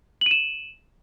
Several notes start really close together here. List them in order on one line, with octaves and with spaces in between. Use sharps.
F#7 D#7 E7